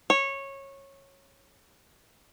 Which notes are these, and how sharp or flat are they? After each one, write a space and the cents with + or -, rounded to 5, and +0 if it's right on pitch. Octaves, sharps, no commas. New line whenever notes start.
C#5 -15